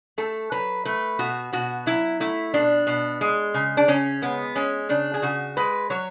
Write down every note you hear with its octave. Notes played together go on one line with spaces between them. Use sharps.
A3 A4
F#3 B4
A3 B4
B2 F#4
B2 F#4
F#3 E4
A3 E4
B2 D4
B2
G#3
C#3
D4
C#3 C#4
G#3 B3
G#3 C#4
C#3 D4
G#4
C#3 F#4
G#3 B4
F#3 C#5